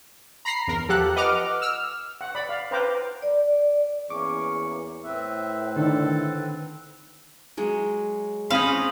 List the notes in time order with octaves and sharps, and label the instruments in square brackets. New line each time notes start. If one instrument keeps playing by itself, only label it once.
[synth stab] A#5 B5 A#6 C7
E2 A#4
F3 G4 A4 F#5 F#6
B4 D#5 F#5 D6 F6
E6 F6
[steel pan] F#5
D5 B5
F5
B4 C5 F5 G5 A#5 D6
[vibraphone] D5
[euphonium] E2 [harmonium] A#3 C#4 [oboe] C#6 [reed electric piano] D6
[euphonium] A2 [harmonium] C4 B4 [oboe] E5
[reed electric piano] D3 D#3 [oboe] A4
[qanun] F#3 G#3
[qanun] C4 C#4 C#5 [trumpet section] D#4 B5 D#6 [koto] F5